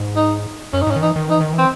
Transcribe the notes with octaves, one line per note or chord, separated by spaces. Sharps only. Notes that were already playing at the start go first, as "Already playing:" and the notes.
Already playing: G#2
D#4
F#2 C#4
D#4
G#2 C#4
D#3
E3 D#4
D#3
E3 D#4
D#3
E3
C4